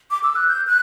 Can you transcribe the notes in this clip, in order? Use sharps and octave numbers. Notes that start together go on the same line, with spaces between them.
D6
E6
F#6
G6
F#6